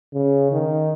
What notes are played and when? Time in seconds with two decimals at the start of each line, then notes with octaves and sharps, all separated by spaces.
0.13 C#3
0.52 D#3